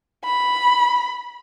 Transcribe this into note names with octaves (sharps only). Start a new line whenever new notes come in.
B5